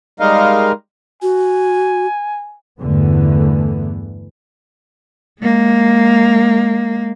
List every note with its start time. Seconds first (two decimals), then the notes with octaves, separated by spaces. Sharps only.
0.20 G3 G#3 D#4 A#4 D#5 F5
1.22 F#4 G#5
2.81 E2 G2 D3 E3 A3 B3
5.41 G#3 A#3